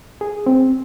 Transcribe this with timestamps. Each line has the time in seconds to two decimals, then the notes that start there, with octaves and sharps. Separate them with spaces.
0.21 G#4
0.46 C4